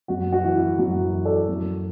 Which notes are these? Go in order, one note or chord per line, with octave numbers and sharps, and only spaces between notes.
F#2 F#4
F#4
E3
E4
F#2 F#4
E3
A4 D5
F#2